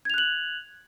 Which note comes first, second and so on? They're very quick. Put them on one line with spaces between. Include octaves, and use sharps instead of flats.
G#6 F7 F#6 F#7